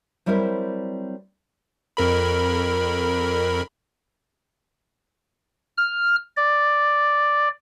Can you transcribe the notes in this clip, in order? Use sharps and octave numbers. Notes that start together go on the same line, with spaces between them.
F#3 G3 C4 E4 A#4 C5
F2 A#4 B5
F6
D5